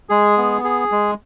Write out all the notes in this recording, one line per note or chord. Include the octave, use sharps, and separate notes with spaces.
G#3 G#4
B3
G#4
G#3